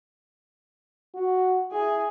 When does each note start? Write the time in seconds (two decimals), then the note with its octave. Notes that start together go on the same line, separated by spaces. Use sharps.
1.15 F#4
1.72 E4 G#4